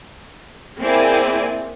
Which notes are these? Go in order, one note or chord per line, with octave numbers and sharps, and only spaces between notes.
A#3 C4 E4 G#4 D5 G#5